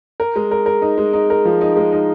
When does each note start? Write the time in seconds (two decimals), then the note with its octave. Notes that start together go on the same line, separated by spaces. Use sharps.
0.20 A#4
0.36 G#3
0.51 A#4
0.66 A#4
0.82 D#4
0.98 G#3
1.13 D#4
1.30 A#4
1.45 F3
1.61 D#4
1.77 G#3
1.92 D#4